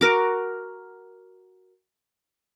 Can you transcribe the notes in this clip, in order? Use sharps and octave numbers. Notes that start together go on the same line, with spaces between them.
F#4 A#4 D6